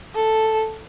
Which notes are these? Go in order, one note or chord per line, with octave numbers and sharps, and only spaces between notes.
A4